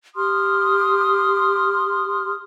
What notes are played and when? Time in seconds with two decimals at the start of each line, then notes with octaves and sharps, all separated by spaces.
0.16 G4 C6 D#6 F6